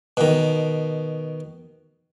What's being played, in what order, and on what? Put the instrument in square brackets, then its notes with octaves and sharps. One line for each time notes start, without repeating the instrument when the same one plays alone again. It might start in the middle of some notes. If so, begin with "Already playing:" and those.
[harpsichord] B2 D#3